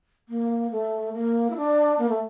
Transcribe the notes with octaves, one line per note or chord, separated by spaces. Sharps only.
A#3
A3
A#3
E4
D4
A#3
A3